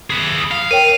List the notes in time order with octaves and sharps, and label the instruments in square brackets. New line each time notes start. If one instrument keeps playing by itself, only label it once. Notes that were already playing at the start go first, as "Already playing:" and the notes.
[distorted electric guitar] G#4 B4
F5
[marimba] A#4 C#5 G5 [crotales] D#7